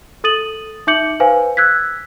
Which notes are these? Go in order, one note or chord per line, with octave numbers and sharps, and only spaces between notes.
A4 D#6 A6 D#7 F#7
D#4 E5 D6 G6 C#7 F#7
B4 C5 F5 G#5
E6 F#6 G#6 B6